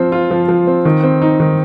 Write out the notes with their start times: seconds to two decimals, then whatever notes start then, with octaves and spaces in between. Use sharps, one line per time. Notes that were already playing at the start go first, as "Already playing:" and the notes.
Already playing: F3 C4
0.12 F4
0.31 F3
0.49 F3
0.67 C4
0.85 D#3
1.03 C4
1.22 D#4
1.40 D#3